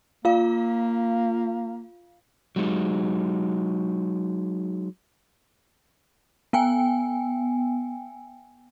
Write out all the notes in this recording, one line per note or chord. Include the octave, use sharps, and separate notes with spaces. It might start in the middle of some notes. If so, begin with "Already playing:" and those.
A#3 F4 F5
F#3 G#3 D#4
B3 G5 G#5